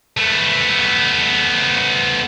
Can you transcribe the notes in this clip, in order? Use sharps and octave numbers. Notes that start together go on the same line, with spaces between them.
A3 B3